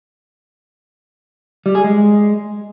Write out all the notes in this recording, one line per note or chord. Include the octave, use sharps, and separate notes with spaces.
G3
G#4
G#3